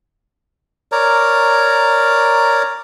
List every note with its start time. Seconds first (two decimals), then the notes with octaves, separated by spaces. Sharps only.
0.92 A#4 C#5 D5 A#5